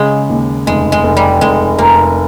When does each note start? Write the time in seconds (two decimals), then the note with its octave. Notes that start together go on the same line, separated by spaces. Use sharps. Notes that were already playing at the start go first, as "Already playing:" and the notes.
Already playing: C#3 G#3
0.29 D#2
0.67 F1 G#3
0.92 G#3
1.04 F1
1.17 G3
1.41 F1 G#3
1.78 F1 A#3